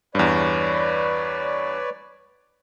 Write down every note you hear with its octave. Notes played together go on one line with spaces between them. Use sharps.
E2 G2 B4 C#5 D5